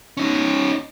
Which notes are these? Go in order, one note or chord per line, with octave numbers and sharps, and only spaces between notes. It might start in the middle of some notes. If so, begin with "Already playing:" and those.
C#4 D#4